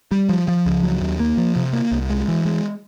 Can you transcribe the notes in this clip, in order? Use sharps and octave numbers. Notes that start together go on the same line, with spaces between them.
G3
F3
F3
C#2
F#3
D#2
A#3
F3
C3
A#3
C2
G#3
E3
G#3